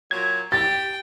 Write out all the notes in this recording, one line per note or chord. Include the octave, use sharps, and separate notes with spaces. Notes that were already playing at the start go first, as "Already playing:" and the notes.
A#2 F#3 G#6
G4 G5 A6